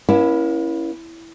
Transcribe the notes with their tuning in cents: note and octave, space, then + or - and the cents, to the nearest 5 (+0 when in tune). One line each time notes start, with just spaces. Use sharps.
A#3 +40 C#4 +0 E4 +0